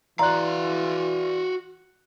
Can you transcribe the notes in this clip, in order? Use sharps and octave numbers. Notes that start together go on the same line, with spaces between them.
E3 F#4 D5 F5 A#5 C6 F#6